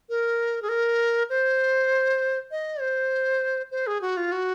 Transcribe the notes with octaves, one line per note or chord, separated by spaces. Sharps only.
A#4
G#4
A#4
C5
D#5
C5
C5
G#4
F#4
F4
F#4